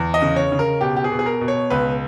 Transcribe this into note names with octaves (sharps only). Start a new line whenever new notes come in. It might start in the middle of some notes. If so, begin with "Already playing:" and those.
Already playing: E2
D#5
C#3
C#5
C#3
A#4
B2 G4
G4
G#4
B2
G#4
A#4
B2
C#5
C#2 B4